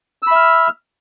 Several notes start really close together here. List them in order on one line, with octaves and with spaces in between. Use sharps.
E6 B5 E5 F6